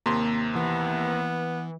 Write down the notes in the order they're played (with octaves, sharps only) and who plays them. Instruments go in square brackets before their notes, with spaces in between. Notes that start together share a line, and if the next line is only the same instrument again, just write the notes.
[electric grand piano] D#2 C3 C6 [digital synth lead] A#3
[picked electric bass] E3 [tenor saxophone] B3